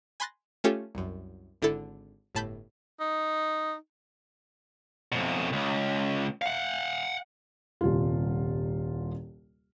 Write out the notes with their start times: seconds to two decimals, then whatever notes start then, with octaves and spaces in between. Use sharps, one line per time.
0.20 G#5 B5 C6 F#6 A6 A#6
0.64 A3 C#4 F4 G4 A4 C#5
0.95 C2 F#2
1.62 G#1 D3 E4 A4
2.35 G1 A2 A5 B5 G6 B6
3.00 D#4
5.12 F2 B2
5.53 C#2
6.42 F5 F#5
7.81 D#1 C2 F4